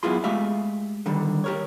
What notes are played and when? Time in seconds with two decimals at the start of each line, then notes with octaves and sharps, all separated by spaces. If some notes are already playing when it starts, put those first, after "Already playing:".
0.03 F#2 B3 E4 F4 G#4 C6
0.24 G#3 A3 G4 E5 F5
1.06 D3 D#3 G3
1.44 G4 A#4 C#5